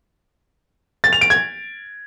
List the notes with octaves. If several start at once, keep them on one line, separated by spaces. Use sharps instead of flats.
A6
F7
D7
G#6